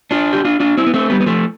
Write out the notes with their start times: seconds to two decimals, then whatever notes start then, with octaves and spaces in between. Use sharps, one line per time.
0.11 D4 F4
0.33 G4
0.45 D4 F4
0.60 D4 F4
0.77 C4 E4
0.87 B3
0.94 A3 C4
1.10 G3 B3
1.21 B3
1.26 F3 A3